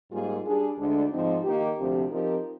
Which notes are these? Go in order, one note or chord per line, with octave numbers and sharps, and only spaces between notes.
G#2 G3 A#3 F4 G#4
G3 D4 G#4
D2 D3 G#3 D4
G#2 F3 C4 D#4
D#3 A#3 D#4 G4
D2 C3 F3 C4 G4
F3 C4 D#4 G4 A#4